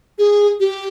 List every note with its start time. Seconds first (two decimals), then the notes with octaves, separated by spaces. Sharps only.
0.19 G#4
0.60 G4